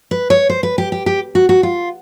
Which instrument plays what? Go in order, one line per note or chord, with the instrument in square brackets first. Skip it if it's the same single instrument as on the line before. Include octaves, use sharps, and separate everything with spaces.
[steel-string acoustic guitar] B4
C#5
C5
B4
G4
G4
G4
F#4
F#4
F4